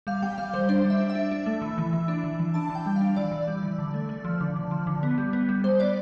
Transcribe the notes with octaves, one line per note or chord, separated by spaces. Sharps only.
G3 F5
G3 G5
G3 F5
G3 C5
D4 C5
G3
E5
D4
E5
D4
D4
A3
E3
E3
E3
D4
E3
E3
D4 A5
E3
G5
G3
D4 F5
E3 D5
E3
G3
E3
D3
A3
A3
F3
D3
D3
F3
D3
B3
G3
B3
G3
G3 C5
B3 D5